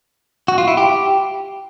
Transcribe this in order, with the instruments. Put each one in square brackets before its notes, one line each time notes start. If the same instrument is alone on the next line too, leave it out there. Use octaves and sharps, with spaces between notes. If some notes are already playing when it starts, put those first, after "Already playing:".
[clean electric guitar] F#4
F4
E4
G4